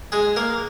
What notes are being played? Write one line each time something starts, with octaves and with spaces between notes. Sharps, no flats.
G#3 G#4
A#3 A#4